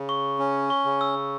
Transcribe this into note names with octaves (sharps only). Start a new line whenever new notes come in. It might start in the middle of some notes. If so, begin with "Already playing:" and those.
Already playing: C#3
C#6
C#4
C#6
C#3
E6